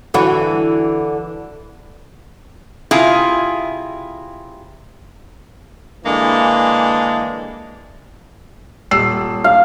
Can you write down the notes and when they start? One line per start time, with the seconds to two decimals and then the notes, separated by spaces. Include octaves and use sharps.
0.14 D3 E3 F#4
2.91 C3 E4 F4 G#4
6.05 D3 E3 G#3 A#3 D4
8.91 D#1 E6 C7
9.44 F5